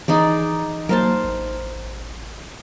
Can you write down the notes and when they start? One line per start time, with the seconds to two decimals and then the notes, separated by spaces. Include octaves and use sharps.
0.08 E3 D#4 G#4 D5
0.89 F#3 A#3 A#4 C5 A5
1.24 A1